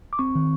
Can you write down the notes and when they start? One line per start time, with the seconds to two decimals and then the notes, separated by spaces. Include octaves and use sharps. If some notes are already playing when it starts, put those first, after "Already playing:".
0.13 D6
0.19 C4 C#6
0.35 D#3